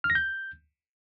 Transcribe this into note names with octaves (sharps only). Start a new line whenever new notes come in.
F6
A#6
G6